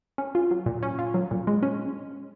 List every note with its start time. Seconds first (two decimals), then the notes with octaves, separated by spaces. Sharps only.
0.18 C#4
0.35 F4
0.51 F#3
0.66 A#2
0.83 C#4
0.99 F4
1.14 F#3
1.31 A#2
1.47 G#3
1.63 C#4